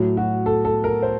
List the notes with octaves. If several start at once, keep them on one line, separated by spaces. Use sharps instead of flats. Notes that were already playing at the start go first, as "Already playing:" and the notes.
Already playing: A2 F#3
F#4
A4
A4
A#4
C5